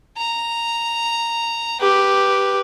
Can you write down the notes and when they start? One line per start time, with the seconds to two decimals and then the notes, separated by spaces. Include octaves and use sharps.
0.17 A#5
1.81 G4 B4